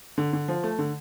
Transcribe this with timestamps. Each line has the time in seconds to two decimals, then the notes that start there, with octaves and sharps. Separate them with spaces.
0.18 D3
0.33 D3
0.48 F3
0.63 A3
0.79 D3